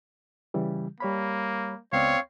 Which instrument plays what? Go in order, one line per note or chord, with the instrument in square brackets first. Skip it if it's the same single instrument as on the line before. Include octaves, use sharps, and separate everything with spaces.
[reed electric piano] C#3 E3 G3
[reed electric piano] G3 C#5 B5 [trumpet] A#3
[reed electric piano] C#2 B3 D5 [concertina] C4 F5 [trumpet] C#5